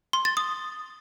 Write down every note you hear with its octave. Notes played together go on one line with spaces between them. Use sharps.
C6
A6
D#6